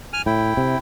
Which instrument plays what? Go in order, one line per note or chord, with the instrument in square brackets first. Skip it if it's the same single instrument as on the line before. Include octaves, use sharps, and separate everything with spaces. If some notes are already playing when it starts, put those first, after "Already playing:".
[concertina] G#5 F6
[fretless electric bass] A2 [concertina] E4 G5
[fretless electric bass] C3